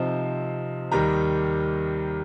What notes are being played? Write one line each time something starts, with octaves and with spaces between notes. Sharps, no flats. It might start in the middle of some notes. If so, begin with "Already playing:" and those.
Already playing: C3 F3 C4 D#4
D#2 D#3 G3 A#5